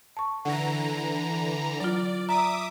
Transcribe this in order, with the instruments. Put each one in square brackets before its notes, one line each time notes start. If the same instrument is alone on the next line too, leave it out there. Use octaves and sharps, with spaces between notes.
[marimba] A5 C#6
[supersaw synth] D3 E3 A#5 [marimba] F#5
[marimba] F#3 F4 [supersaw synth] D5
[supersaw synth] E5 D6 D#6 [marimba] A#5